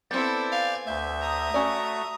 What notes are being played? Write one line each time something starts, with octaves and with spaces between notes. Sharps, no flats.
B3 C4 E4 A4 D5 G6 A6
F5 G#5
D2 E5 G6
A#5 D#6
A3 C#4 F#4 D5